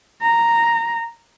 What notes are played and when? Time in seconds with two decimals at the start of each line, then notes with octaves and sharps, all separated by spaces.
0.22 A#5